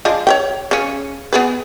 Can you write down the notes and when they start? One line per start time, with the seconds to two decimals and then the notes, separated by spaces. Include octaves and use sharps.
0.05 F3 G#3 D4
0.27 C#5 E5 G5
0.71 C#3 C#4
1.33 B3 G#4 B4